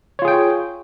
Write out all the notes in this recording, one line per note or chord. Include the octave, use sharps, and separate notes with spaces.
F4 G#4 C#5 G5